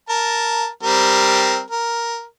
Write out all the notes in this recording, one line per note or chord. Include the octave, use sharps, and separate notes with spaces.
A#4 A5
G3 C4 A#4
A#4